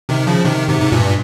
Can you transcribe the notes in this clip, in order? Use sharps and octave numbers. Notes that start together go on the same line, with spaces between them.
C3 D#3
C#3 F3
C3 D#3
G#2 C3
G#2
G2 A#2